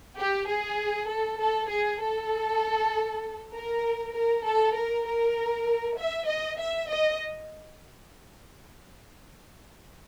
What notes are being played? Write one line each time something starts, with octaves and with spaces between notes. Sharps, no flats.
G4
G#4
A4
A4
G#4
A4
A#4
A#4
A4
A#4
A#4
E5
D#5
E5
D#5